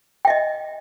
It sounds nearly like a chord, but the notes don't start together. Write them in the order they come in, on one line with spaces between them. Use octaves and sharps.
G5 E5 D#5